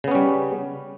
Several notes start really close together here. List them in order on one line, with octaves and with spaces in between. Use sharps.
C#3 B3 C#4 G3